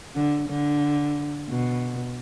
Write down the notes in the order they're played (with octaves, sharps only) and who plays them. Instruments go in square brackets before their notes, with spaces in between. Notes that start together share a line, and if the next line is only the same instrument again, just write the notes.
[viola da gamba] D3
D3
B2